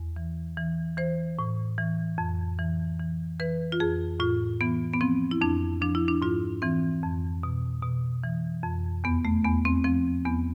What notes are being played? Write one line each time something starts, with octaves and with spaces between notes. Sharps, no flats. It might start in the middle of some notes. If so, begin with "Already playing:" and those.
Already playing: E2
E3
E3
E3 C5
A2
E3
F2
E3
E3
E3 B4
F4
F2 G#4
A2 F4
E3 B3
B3
F3 C4
E4
F2 D4
F3 D4
E4
D4
G#2 F4
E3 C4
F2
B2
B2
E3
F2
E2 B3
A3
E2 B3
C4
F3 C4
E2 B3